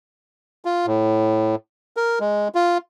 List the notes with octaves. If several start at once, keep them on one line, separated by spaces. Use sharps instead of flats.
F4
A2
A#4
G#3
F4